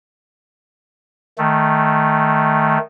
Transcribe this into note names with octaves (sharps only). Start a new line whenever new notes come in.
D#3 A3